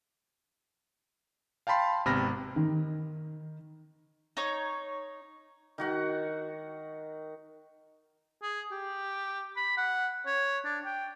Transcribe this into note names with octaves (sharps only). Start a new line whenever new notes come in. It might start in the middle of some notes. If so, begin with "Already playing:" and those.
F5 G5 A5 B5 C6
G#1 C3 B3 B5 F6 A#6
D#3
D#4 C#5
D#3 F#4 F#5
G#4
G4
B5
F#5
C#5
D4
G5